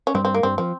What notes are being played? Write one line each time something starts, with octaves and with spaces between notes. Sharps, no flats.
C#4
G2 G3 C4
C4
A#3
G2 G3 C4
F3 C4